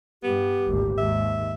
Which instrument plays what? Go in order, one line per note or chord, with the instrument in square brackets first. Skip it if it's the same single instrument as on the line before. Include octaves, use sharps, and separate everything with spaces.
[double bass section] G2 [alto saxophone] B3 [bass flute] G4
[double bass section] G#1 D2 A#2
[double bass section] D#2 G#2 [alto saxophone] E5